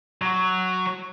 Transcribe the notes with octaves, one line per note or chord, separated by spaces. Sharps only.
F#3 F#4